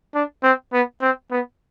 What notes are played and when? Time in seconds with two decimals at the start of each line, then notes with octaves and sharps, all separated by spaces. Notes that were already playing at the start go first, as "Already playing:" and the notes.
0.14 D4
0.43 C4
0.73 B3
1.02 C4
1.31 B3